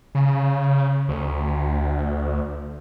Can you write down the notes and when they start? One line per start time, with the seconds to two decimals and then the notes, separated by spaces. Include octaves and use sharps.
0.15 C#3
1.08 D2